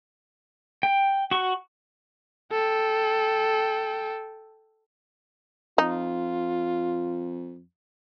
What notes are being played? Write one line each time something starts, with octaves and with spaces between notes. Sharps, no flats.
G5
F#4 C#6
A4 G5
F2 D#4 F4